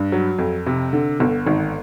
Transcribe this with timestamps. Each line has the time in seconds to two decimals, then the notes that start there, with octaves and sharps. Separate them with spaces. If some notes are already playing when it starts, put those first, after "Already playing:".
Already playing: G2
0.12 F#3
0.38 F2
0.66 C3
0.93 D3
1.20 G1
1.47 G#1